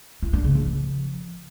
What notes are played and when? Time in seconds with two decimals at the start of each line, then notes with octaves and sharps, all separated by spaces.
0.22 E4
0.33 D4
0.44 C#3
0.55 F3